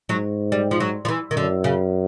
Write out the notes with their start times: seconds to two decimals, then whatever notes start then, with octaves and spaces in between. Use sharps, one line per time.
0.09 G#2 F#3
0.52 G3
0.71 F3
0.80 F#3
1.05 F3
1.08 E3
1.31 D#3
1.37 F#2 D3
1.64 C#3